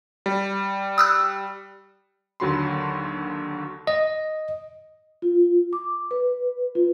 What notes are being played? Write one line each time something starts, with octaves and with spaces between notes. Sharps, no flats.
G3
D#6 E6 F#6
D#2 D3 F#3 F#4 B5 C6
D#5
F4
D6
B4
F4